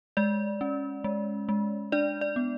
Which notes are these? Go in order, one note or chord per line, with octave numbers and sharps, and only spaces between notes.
G#3 D5
C#4
G#3
G#3
D4 D5
D5
B3